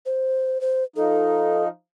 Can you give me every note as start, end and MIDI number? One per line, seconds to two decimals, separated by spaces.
0.06 0.61 72
0.61 0.83 72
0.96 1.68 53
0.96 1.68 63
0.96 1.63 69